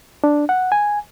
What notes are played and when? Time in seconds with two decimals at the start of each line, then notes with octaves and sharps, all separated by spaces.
0.24 D4
0.49 F#5
0.72 G#5